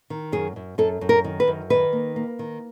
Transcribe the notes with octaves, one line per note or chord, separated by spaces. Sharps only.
D#3
F#2 G#4
F#2
F#2 A4
F#2
A#4
D#3
B4
F#2
D#3 B4
A#3
A#3
D#3